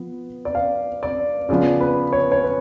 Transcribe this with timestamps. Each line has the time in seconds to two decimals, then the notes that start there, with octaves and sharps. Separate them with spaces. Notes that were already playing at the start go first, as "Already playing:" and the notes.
Already playing: F3 B3
0.45 D5
0.55 F5
1.03 D5
1.49 C#3 F3 B3 F4 D5
1.80 B4
2.13 C#5
2.32 C#5
2.44 B4